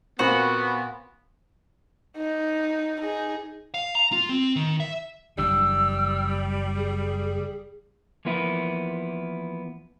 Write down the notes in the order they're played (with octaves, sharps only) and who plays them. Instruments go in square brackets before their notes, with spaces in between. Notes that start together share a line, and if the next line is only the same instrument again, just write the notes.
[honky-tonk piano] A#2 C4 B5 [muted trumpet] B3 [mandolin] F#4
[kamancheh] D#4
D#4 G#4
[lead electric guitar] F5
A#5
F4
C4
D#3
E5
[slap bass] F#1 E3 D4 [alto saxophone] G3 [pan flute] E6
[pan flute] G#4
[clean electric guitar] E3 F3 A#3 B3 E4